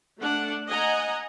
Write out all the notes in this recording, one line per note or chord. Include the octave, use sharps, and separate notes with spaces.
A3 D4 F#5
D#5 F#5 G#5 A#5